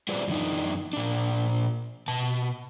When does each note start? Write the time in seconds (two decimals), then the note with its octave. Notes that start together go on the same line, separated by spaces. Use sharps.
0.09 G3 F4 G#4 B4 C5 D5
0.28 F#2 E3 D4 D#4
0.93 A#2 D4
2.08 B2 A5